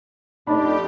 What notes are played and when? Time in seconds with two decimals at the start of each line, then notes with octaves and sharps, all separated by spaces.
0.47 F2 A3 D4 D#4 G4 D5 D#5 B5